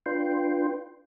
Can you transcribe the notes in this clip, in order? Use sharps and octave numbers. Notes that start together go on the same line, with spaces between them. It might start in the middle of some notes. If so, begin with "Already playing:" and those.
D4 F4 B4 G5 C6